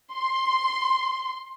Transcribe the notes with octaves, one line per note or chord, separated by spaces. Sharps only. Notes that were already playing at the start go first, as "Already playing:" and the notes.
C6